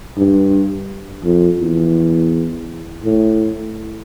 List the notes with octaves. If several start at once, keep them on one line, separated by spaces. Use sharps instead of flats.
G2
F2
E2
A2